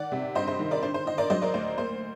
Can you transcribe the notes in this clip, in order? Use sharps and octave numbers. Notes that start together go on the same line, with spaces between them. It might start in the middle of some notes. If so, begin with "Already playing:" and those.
Already playing: D#3 D5 F#5
C3
G2 C5 D#5
C5
D#3
A#4 D5
D3 C5
C5
D3 D#5
A#4 D5
F#3 C5 D#5
A#4 D5
D2 C5
A#3 C5